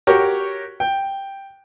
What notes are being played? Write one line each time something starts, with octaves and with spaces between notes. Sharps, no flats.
F#4 G4 A#4 C#5
G5